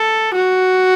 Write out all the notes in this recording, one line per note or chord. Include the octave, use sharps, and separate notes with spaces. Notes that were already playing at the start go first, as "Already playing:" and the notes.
Already playing: A4
F#4